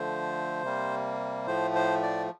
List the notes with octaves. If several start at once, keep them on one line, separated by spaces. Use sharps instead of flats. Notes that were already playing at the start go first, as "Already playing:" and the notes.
Already playing: D3 F3 A3 C5
C3 G3 A#3
A2 F3 A3 C5
C5
D5